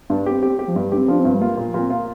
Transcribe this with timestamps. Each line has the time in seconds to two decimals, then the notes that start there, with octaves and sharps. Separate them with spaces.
0.10 G2 D4
0.26 G4
0.32 C4
0.43 G4
0.59 G4
0.67 F3
0.75 G2 G3
0.92 D4 G4
0.97 C4
1.08 F3 D4
1.20 C4
1.25 G2
1.34 G3
1.41 A#3 F4
1.57 A#2
1.63 F3
1.74 A#2 C4
1.90 A#3 F4